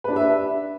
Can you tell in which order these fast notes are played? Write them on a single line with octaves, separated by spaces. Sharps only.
B4 D4 G4 E5